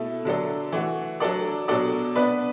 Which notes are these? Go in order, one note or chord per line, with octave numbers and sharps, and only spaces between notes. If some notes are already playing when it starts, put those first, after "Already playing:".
Already playing: B2 A3 E4 A4
D3 F#3 D4 A4
E3 A3 F#4
F#3 D4 A4 D5
B2 F#3 D4 A4 D5
B3 D4 B4